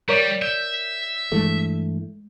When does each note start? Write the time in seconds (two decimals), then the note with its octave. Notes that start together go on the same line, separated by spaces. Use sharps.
0.09 G3 A#4 C#5 D5
0.42 E5 G6
1.32 G2 E3 G#3 A3